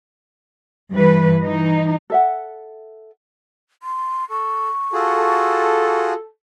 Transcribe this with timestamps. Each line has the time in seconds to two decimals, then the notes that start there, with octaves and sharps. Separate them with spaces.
0.92 G2 E3 B4
1.43 E3 D#4
2.10 A4 E5 F#5
3.83 C6
4.30 A4 C#6
4.93 F4 F#4 G#4 A4